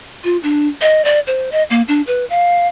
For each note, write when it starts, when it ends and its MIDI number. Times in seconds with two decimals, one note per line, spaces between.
0.24 0.37 65
0.43 0.68 62
0.81 1.04 75
1.05 1.20 74
1.27 1.50 72
1.52 1.63 75
1.70 1.82 58
1.88 2.02 62
2.07 2.25 71
2.30 2.67 77